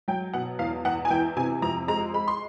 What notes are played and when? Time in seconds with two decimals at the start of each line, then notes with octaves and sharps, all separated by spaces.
0.08 F#3 G5
0.34 B2 F#5
0.59 E2 F5
0.85 E2 F#5
1.05 G#5
1.10 E3 G5
1.37 C3 G#5
1.62 F2 A#5
1.88 G#3 A#5
2.14 G#3 B5
2.28 C6